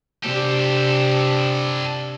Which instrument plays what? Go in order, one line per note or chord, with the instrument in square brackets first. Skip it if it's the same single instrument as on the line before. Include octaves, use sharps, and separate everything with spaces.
[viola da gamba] C3 D4 [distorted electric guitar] G4 A4